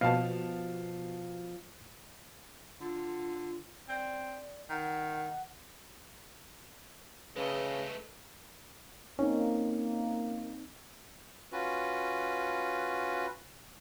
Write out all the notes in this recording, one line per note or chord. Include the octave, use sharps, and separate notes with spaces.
B2 F3 F5 A5
D3 F4
C4 D5
D#3 F#5
C#3 G#3 A3 A4 B4 D#5
A#3 C4 C#4 D#4
C#4 F4 F#4 B4